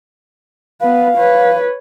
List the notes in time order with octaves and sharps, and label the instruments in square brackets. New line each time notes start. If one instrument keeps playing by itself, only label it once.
[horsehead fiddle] B3 B4 [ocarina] F5
[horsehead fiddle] B4 C#5